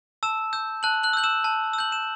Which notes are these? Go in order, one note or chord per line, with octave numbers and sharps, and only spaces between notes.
A5 E6 E7
E6 G6
A5 F#6 F#7
F#6 F#7
E6
G6 F#7
E6 E7
A5
E6
G6 F#7
E7